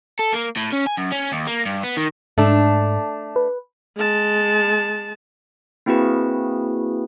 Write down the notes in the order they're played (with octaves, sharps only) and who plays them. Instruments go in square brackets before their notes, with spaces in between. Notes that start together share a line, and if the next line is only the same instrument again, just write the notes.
[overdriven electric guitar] A4
A#3
A2
C#4
G#5
F#2
C#4
D#2
A#3
G2
B3
D#3
[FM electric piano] G#2 [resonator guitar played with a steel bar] A3 D4
[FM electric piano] B4
[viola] G#3 A5
[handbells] A#3 C4 E4 F#4 G#4 B4